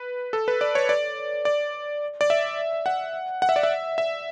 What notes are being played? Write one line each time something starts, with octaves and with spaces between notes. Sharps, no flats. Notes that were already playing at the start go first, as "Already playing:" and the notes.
Already playing: B4
A4
B4
D5
C#5
D5
D5
D5
E5
F#5
F#5
E5
D5
E5
E5